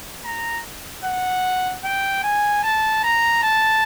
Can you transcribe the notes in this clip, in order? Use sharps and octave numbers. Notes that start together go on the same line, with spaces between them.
A#5
F#5
G5
G#5
A5
A#5
A5